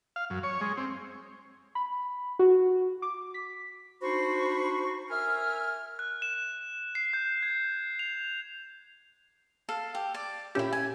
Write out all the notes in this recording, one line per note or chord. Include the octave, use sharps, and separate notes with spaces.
F5
F#2
C#5
G#3
C4
B5
F#4
D6
B6
D4 D#4 F#4 C5 B5 C#6
A#4 E5 G#5 F6
F#6
E7
C7
G6
G#6
F7
A4 F5
G4
D5
A#2 C#4 E4 G4 E5
G#5